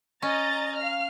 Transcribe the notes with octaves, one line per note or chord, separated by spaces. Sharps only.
C#4 D#5 A#5 A6
F5 F6